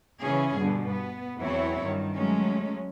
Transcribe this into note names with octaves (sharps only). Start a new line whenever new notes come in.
C#3 E3 C#4 G#4
G2 B2 D3
B3
E2 E3 F#3 C4 E4 C#5
G2 D#3
F#3 G#3 A3 C#4